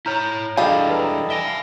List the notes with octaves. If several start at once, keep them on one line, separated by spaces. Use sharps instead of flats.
E4 C#5 A#5 F6 G6
E3 G3 D4 E4 F4 G#4 A4 D#5
B4 A#5
E5 G#5 A#6 D7 G7
F5